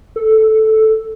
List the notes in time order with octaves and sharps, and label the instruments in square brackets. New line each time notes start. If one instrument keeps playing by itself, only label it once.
[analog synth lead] A4